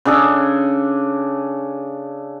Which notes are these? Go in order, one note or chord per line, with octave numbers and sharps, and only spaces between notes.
C#3 D4 G#4 A4